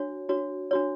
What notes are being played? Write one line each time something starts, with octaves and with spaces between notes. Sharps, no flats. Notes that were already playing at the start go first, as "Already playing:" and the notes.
Already playing: D4 F#4 C#5
D4 F#4 C#5
D4 F#4 C#5